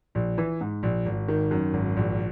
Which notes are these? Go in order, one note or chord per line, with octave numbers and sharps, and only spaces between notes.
A#1
E3
G#2
A#1
G#1
D#3
F#2
G#1
A#1